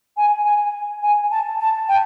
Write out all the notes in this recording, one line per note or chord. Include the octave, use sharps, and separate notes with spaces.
G#5
G#5
G#5
A5
A5
G5